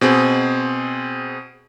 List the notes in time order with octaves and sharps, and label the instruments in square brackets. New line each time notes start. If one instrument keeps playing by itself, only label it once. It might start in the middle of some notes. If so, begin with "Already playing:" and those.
[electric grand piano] B2 C4 G#4